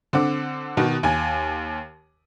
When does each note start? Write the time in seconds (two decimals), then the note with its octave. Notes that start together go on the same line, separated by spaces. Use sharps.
0.13 D3 C4 F#5 D6
0.77 B2 D#3 F#4
1.03 D#2 G#5